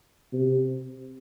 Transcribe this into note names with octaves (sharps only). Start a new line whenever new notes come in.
C3